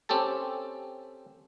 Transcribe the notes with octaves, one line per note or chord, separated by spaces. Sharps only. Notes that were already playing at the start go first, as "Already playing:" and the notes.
C4 C#4 G4 A4 A5